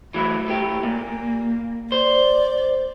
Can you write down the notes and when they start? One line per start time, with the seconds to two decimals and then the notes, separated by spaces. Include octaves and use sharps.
0.14 E3 F#3 A3 E4
0.48 A2 G4
0.83 A#2 A#3
1.92 C5 D5